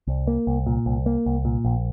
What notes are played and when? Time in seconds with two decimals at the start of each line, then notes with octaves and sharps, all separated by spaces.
0.07 C2
0.27 A#3
0.47 C2
0.66 A#2
0.86 C2
1.06 A#3
1.26 C2
1.45 A#2
1.65 A#1